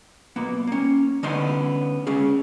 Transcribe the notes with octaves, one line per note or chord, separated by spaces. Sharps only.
B1 A#3 B3
A#3 C#4
D3 A3 B3 C#4 D#4 C6
G#3 C#4 G#4